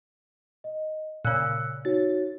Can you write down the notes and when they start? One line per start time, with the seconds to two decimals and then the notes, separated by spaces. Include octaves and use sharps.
0.64 D#5
1.25 A#2 C#3 E6 F#6 C#7
1.85 D#4 F#4 C#5 A6